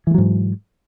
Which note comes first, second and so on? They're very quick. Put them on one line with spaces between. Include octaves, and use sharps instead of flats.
E3 G#3 F#3 G#2